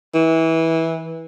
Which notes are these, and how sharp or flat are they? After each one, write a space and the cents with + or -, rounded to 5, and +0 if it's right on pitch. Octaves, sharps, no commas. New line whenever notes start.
E3 -20